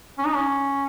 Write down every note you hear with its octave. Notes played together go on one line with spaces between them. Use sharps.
C#4
D#4
C#4